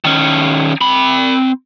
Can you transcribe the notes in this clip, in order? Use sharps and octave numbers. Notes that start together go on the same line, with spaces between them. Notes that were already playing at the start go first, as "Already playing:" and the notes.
D#3 C#4
C4 B5